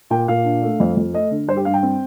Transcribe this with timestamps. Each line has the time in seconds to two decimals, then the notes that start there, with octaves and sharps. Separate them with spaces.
0.10 A#2 G5
0.28 A#2 F5
0.44 D4
0.62 A3
0.80 F2
0.97 F2
1.13 A3 D#5
1.31 D3
1.48 G2 C5
1.57 G4
1.65 G2 F5
1.74 G5
1.83 C4